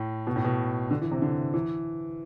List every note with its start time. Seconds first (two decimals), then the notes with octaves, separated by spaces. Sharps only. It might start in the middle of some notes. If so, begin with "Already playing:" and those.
Already playing: A2
0.27 B2
0.36 A2
0.44 B2
0.91 D3
1.01 E3
1.12 C3
1.22 D3
1.54 E3